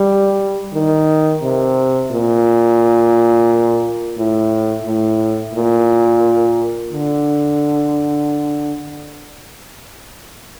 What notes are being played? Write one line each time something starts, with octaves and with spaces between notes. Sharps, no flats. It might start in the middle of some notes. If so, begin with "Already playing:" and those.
Already playing: G3
D#3
C3
A#2
A2
A2
A#2
D3